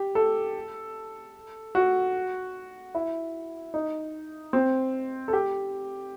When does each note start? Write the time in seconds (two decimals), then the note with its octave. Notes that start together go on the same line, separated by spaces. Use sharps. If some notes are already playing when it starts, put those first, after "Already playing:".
Already playing: G4
0.15 A4
1.75 F#4
2.95 E4
3.74 D#4
4.53 C4
5.28 A4
5.33 G4